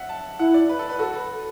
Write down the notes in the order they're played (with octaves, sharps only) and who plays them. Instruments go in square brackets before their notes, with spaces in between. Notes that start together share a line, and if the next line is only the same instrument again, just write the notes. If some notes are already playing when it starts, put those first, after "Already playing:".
Already playing: [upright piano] E5 F#5
A5
[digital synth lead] E4 [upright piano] F#5
[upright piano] D5
B4
A4
B4
[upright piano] F#4 [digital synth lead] A4
[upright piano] B4